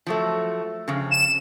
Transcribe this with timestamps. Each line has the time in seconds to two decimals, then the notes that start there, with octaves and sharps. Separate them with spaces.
0.06 F3 F#3 A3
0.88 F2 C#3
1.11 E7